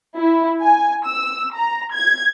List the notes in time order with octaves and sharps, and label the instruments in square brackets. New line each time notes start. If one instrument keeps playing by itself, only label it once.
[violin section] E4
G#5
E6
A#5
G#6